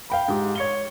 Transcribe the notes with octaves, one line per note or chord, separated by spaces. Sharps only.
F5 G5 B5
G#2 G4
C#5 C#7 G7